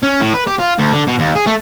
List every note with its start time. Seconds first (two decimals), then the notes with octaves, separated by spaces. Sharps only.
0.03 C#4
0.21 A2
0.34 B4
0.47 G4
0.59 F4
0.79 D2
0.93 D3
1.08 B2
1.20 D#2
1.36 G#4
1.47 A3